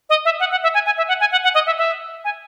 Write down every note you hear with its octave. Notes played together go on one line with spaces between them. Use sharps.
D#5
E5
F#5
F#5
E5
G#5
G#5
E5
F#5
G#5
F#5
F#5
D#5
E5
E5
G#5